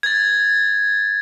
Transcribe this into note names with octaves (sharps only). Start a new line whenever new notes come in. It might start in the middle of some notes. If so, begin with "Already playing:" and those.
G#6 A6